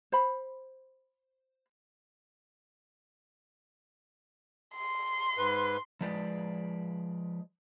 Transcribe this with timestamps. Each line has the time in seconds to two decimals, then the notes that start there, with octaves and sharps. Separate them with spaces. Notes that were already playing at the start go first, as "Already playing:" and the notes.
0.12 C5 B5
4.75 C6
5.37 G#2 B4
6.01 F3 G#3 B4 D5